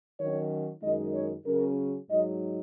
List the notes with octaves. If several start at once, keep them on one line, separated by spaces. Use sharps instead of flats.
D#3 F#3 C#4 C#5
F#2 D#3 G#3 D#4 D#5
C#5
C#3 F#3 C#4 A#4
G#2 F#3 D#4 D#5